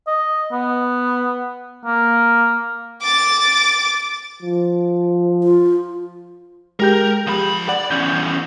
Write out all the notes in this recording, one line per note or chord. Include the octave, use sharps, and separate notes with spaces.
D#5
B3
A#3
D6 A6
F3
F4
G#3 G4 A#4 G6
F3 B5
D5 F#5
E2 C#4 G6